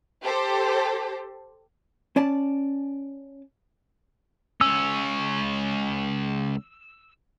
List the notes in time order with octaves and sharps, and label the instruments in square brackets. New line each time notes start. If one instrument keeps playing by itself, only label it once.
[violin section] G4 A4 C5
[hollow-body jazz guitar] C#4 D5 A5
[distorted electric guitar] C#2 C#4 [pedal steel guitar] E6